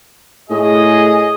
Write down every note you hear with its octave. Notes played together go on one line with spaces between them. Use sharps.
A2 G#4 D#5